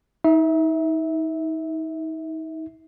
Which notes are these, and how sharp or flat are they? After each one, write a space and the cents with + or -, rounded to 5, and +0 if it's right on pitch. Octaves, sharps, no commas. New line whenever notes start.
D#4 +35 E5 -15